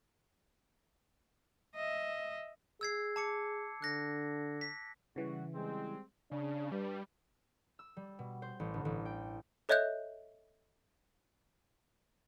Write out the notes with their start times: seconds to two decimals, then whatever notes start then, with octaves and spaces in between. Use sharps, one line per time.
1.75 D#5 E5
2.81 G#4 E6 G#6 C7
3.16 A5 D6 C#7
3.82 D3 F#6 A#6
4.61 B6
5.16 C#3 E3 G3 E4 F#4
5.54 G3 G#3 C4
6.31 C#3 D4
6.72 G2 G3
7.79 E6
7.97 G3
8.19 B2
8.42 C5
8.60 A1
8.74 G1
8.85 A1
9.05 G5
9.69 A4 C#5 D#5 E5 F#6 G6